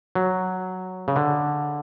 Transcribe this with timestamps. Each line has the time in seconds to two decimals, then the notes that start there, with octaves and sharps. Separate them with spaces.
0.15 F#3
1.08 C#3
1.16 D3